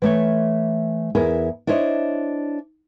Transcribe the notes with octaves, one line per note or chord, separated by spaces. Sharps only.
E3 A3 C#5
E2 E4 G#4 A#4
D4 E4 C5 C#5 D#5